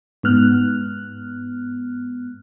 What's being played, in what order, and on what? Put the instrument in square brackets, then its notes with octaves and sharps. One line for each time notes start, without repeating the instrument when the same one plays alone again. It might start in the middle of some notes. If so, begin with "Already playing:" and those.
[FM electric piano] G#2 B3 F6 F#6